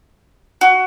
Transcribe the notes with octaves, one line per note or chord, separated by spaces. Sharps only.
F#4